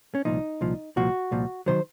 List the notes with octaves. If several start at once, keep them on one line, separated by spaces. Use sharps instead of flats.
C#4
C2 A#2 F3 D#4
C2 A#2 F3
C2 A#2 F3 F#4
C2 A#2 F3
C3 D#3 F#3 C5